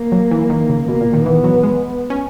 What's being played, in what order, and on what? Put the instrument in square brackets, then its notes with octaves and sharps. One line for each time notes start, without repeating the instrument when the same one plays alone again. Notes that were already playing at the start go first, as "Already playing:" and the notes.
Already playing: [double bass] A#3
[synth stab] F#3
E3
D#3
C#3
[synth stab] B2 [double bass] A#3
[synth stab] A#2
D#3
[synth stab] E3 [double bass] B3
[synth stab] F#3
G#3
C#4